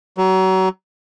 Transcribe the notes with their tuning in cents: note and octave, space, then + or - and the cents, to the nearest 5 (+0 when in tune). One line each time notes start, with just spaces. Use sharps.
F#3 +30